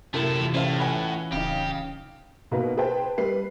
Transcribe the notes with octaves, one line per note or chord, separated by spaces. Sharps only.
F#2 A2 C3 A3 A#3 E4
E3 F4
A2 C#4 C5 F5 A5
B4 F#5 G#5
D1 C#3 D#4 G4
B2 A#3 D#4 B4
G#4 B4 C5 G5 A5
G3 B4 C7